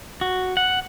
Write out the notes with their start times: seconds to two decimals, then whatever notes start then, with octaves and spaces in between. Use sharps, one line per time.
0.21 F#4
0.57 F#5